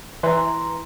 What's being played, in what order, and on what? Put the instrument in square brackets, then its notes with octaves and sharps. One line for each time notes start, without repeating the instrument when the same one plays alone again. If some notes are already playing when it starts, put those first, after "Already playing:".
[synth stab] E3 [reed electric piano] A#5 C6